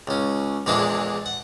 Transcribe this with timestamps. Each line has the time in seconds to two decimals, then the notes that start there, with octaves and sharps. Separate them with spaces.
0.07 C#2 C#4
0.66 A#1 E2 E3 G#3 D4 A4
1.26 F#5